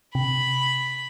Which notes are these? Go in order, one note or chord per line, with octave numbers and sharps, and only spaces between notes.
C3 B5